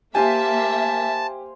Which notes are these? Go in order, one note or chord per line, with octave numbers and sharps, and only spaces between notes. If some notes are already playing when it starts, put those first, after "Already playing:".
A#3 G4 C5 E5 F5 G#5 A5